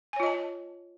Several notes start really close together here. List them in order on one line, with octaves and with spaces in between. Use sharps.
G#5 C#5 F4 D#5 A5